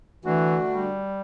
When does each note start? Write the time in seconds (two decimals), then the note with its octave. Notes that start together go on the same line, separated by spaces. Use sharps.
0.25 D3 E3 A3 D4 F#4
0.71 G3